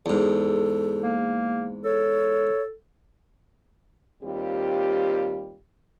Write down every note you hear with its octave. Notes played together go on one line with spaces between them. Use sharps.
E2 G#2 A4
A#3
A4 C#5
D#2 G3 C4 F4 G4